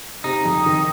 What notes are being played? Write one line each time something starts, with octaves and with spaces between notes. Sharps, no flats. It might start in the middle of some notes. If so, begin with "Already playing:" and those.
C3 D#4
F2
D#3